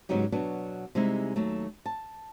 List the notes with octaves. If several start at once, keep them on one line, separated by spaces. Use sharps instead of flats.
G#2 C#3 F#3 B3 D#4 G4
B2 F#3 B3 D4
C3 G3 G#3 D#4 E4
D#2 F#3 A3
A5